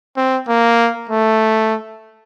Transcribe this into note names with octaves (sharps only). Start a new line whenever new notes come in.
C4
A#3
A3